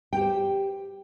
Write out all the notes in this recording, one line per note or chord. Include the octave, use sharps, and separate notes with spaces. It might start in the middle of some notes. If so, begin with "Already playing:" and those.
G4 C5 G5